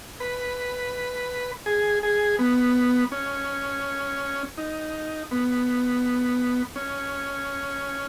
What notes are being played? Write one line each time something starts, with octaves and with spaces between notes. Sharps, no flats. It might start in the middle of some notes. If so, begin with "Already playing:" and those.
B4
G#4
G#4
B3
C#4
D#4
B3
C#4